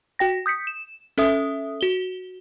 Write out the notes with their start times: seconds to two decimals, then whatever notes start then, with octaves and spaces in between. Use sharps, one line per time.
0.19 F#4 G5 A#6
0.46 D#6 G6 B6 C#7
0.67 E7
1.18 C#4 A4 E5 D#6
1.81 F#4 G7